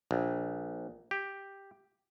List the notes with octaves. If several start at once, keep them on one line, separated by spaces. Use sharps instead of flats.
A#1
G4